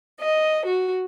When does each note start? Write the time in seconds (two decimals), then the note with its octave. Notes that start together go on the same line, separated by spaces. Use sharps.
0.21 D#5
0.66 F#4